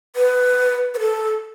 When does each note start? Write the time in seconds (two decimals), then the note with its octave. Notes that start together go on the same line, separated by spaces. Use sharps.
0.16 B4
0.94 B4
1.00 A4